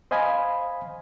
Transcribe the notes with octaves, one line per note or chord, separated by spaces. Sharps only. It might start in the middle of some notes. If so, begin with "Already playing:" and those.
C5 D#5 F5 G#5 B5